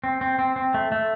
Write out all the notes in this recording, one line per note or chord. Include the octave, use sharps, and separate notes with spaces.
C4
C4
C4
C4
A3
A3